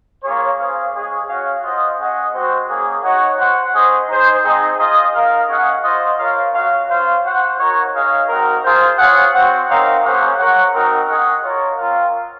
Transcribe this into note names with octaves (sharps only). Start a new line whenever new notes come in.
A#3 F4 G#4 C#5
C#4 G#4 C5 F5
G#3 C#4 G#4 C#5
C#4 F#4 C#5 F5
F4 C5 D#5 F#5
C#4 G#4 D#5 F#5
G#3 C4 F#4 C5
A#3 C#4 G#4
D#4 F#4 C#5 F#5
F#4 C5 F#5
C#4 G#4 C5 D#5
D#4 G#4 C5
C4 D#4 G#4 D#5
F4 G#4 D#5
D#4 A#4 F5
C#4 G#4 D#5 F#5
F4 C5 D#5
F4 A#4 C#5 F5
C#4 F#4 C#5 F5
C#4 F4 C5 F5
F#4 C5 F#5
D#4 F#4 A#4 C#5
D#4 G#4 C#5 F5
C4 D#4 F#4 A#4
F4 G#4 C5
F4 G#4 C#5 F#5
C4 F#4 C5 F#5
C4 D#4 A#4 C#5 F5
A#3 C#4 G#4 C5 F#5
F#4 A#4 C#5 F#5
C4 D#4 F#4 A#4
C#4 G#4 D#5 F#5
F4 A#4 C#5
C4 F4 A#4 F5